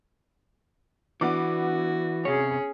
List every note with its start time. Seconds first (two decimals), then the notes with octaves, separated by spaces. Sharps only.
1.21 E3 B3 D4 F#4 D6
2.25 C3 C#4 G#4 C#5